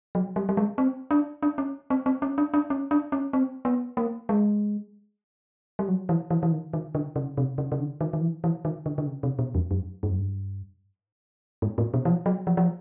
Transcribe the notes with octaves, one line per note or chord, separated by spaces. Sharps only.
F#3
G3
G3
G#3
C4
D4
D4
C#4
C4
C4
C#4
D4
D4
C#4
D4
C#4
C4
B3
A#3
G#3
G3
F#3
E3
E3
E3
D#3
D#3
D3
C#3
C3
C#3
C#3
D3
D#3
D#3
E3
E3
D#3
D3
D3
C#3
C3
B2
F2
F#2
G2
F#2
G2
G#2
A2
B2
E3
F3
F#3
F3
F3